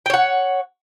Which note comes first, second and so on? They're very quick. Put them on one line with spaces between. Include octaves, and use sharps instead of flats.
G5 C#5 F#5